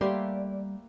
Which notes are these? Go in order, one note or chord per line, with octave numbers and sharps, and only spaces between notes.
G3 A3 A#3 G4 B4 D5 C6